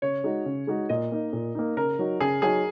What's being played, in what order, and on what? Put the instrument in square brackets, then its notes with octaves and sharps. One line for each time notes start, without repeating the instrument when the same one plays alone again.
[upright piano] C#3 [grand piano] C#5
[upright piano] G#3 D#4 F#4
C#3
G#3 D#4 F#4
[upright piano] A#2 [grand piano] D#5
[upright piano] A#3 D#4
A#2
A#3 D#4
[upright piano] C#3 [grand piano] A#4
[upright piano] F#3 D#4 F#4
[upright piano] C#3 [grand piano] G#4
[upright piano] F#3 D#4 F#4 [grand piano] G#4